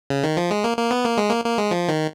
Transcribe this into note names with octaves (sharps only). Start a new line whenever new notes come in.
C#3
D#3
F3
G#3
A#3
A#3
B3
A#3
G#3
A#3
A#3
G#3
F3
D#3